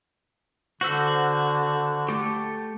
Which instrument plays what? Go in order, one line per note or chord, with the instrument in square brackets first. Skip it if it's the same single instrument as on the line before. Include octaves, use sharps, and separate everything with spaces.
[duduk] D3 [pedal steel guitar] F#4 C5 E6
[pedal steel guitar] A3 G4